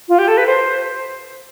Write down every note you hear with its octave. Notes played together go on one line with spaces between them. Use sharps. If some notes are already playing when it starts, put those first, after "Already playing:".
F4
G4
A4
B4
C5